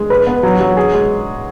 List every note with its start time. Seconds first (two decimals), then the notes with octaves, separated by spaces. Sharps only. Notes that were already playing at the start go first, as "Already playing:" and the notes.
Already playing: G#3
0.10 B4
0.27 B3
0.43 F#3
0.60 F#3
0.77 G#4
0.93 G#3